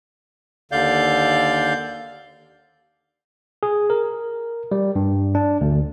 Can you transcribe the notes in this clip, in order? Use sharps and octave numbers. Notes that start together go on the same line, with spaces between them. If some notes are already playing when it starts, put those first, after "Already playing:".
D#2 D3 D5 F5 G6
G#4
A#4
G3
G2
D4
D2